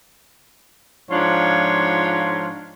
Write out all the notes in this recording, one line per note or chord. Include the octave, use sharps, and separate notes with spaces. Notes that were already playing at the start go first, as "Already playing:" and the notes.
G#2 F3 D4 F4 C#5